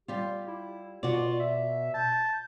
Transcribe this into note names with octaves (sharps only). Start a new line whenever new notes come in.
G3 F4 G4
E4
B2 F4 F#4 D5
E5
A5 G6